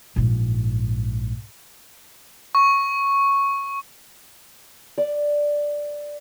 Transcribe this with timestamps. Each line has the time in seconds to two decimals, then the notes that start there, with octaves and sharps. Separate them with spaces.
0.16 A#1 G#2
2.55 C#6
4.98 D5